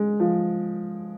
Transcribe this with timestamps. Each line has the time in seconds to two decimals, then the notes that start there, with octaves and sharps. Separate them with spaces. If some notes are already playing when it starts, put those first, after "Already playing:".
Already playing: G#3
0.20 F3